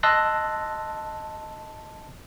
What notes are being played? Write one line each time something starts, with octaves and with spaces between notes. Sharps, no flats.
D#5 A5 C6 E6 F#6 A#6